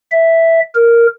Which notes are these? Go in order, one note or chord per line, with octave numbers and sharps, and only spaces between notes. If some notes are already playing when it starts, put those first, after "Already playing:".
E5
A#4